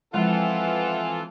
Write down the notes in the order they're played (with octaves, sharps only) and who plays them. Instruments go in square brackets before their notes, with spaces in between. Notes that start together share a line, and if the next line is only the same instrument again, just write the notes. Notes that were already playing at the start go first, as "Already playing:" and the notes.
[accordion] E3 [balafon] F3 G#3 [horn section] C4 F4 A4 [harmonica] E4 F#5